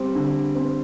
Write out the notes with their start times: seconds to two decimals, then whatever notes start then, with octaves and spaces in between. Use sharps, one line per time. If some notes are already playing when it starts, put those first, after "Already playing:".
Already playing: G3 C4
0.15 D3
0.55 C4